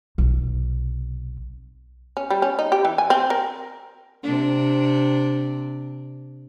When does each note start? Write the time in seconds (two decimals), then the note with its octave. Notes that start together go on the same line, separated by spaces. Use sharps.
0.18 B1 C3
2.17 C#4
2.30 G3
2.42 C#4
2.59 D#4
2.72 G4
2.85 E3
2.98 G#5
3.10 C4
3.30 A#4
4.23 C3 D4